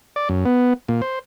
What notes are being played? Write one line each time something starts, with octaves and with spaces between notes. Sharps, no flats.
D5
F#2
B3
A#2
C5